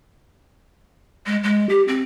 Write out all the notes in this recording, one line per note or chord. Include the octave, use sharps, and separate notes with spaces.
G#3
G#3
G4
C4